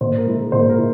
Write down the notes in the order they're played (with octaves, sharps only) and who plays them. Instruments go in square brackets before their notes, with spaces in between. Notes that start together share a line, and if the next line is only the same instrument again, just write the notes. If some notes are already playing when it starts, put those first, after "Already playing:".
[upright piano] A#2 C5
A#4
G#3 E4
A#4
A#2 C5
A#4
E4